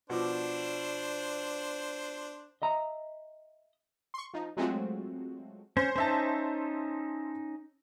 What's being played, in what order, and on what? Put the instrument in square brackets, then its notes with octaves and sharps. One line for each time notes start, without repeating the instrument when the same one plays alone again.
[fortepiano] B2 F3 D6 [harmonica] D4 C5
[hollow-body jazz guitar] D#5 E5 A#5
[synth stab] C6 C#6
F3 D#4
F#3 G#3 A3 C4 F4 F#4
[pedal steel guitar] C#4 [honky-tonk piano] C5
[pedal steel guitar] C#4 D#4 [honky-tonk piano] C5 E5 A5